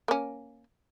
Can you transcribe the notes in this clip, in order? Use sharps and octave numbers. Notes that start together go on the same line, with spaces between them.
A#3 C#4